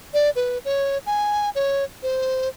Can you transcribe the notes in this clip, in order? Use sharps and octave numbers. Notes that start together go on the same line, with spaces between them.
D5
B4
C#5
G#5
C#5
C5